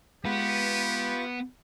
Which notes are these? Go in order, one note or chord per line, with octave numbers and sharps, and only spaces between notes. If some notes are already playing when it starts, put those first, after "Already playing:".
G#3 B3 F4 G4 B4 C#6